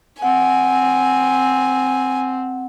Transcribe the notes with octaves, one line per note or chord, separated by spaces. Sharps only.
C4 F#5 G#5